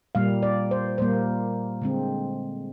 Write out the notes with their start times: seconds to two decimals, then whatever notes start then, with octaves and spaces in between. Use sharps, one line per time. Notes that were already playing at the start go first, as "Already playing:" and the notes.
0.15 A#2 G3 A#3 F5
0.43 D5
0.71 C5
0.98 A#2 G3 A#3 C5
1.82 D3 G#3 C4